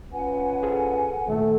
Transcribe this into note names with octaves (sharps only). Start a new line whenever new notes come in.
C#4 F4 B4 F#5 G#5
G#4 A4 C5
D#2 A#2 D#3 A3